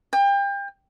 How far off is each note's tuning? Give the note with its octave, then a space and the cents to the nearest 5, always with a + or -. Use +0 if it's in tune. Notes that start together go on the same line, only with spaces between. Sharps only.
G5 +30